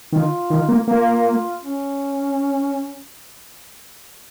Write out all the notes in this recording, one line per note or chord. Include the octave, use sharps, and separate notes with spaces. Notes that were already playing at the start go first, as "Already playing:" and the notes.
D#3 F4
D#3
A#3
A#3 F4
C#4